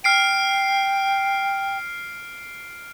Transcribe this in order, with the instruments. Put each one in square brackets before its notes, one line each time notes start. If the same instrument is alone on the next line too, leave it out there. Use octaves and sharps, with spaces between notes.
[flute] G5 [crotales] F6 C7 D7